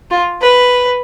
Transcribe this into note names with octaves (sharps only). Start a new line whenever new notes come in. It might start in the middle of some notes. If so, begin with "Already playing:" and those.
F4
B4